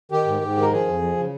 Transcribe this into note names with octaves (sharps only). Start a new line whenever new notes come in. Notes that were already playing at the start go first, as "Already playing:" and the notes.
D#3 G4
G#2
G#2
D#3
A#4
F3 G#4
F2
F3
C#3